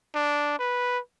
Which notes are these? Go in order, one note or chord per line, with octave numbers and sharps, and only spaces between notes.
D4
B4